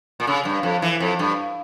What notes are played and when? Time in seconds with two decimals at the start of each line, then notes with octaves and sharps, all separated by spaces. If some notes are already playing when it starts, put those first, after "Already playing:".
0.20 A#2
0.27 C#3
0.45 G2
0.63 F2
0.82 E3
1.00 F2
1.19 G2